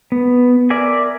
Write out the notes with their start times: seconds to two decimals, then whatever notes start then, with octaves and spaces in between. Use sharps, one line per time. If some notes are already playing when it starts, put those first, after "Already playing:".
0.12 B3
0.70 A#4 D5 E5 G#5